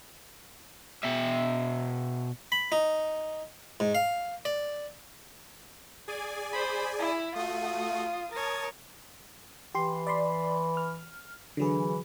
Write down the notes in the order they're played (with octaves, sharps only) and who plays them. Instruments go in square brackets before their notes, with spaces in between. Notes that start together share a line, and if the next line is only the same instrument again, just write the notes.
[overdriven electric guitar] B2 E5
[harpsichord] B5
D#4
G#2
F5
D5
[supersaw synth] G#4 D5 G#5
[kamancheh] C5 B5
E4 B5
[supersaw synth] A3 F#4 [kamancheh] F4 D#6
[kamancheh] A#4 C#5 [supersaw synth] A5 D#6 A6
[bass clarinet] E3 [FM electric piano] G4 C6
[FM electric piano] D5 B5 C6
F6
[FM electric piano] D3 F#3 G#4 [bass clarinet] E3